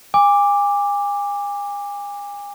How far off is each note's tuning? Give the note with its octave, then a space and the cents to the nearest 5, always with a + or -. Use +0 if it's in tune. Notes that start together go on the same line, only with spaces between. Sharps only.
G#5 -35 D6 +0